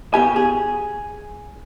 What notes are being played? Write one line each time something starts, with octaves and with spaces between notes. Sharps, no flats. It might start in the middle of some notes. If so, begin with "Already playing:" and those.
B2 G4 G#5
G#4